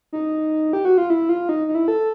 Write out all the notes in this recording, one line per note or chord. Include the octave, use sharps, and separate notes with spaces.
D#4
G4
F#4
F4
E4
F4
D#4
D#4
E4
A4